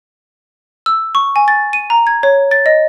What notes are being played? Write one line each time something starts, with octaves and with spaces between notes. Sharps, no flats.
E6
C#6
G#5
A6
D#7
A#5
G#6
C#5
A6
D#5